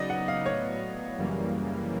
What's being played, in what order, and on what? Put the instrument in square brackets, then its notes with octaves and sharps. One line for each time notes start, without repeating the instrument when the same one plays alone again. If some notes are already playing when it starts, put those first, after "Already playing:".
Already playing: [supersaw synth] C#3 F#3 B3 D#4 [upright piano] D5 D#5
[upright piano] F#5
F5
[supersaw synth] A2 F#3 B3 [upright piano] C#5
[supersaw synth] F#2 C#3 E3 G3 A#3